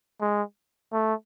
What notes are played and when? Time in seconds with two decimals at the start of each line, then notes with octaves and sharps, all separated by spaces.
0.21 G#3
0.93 A3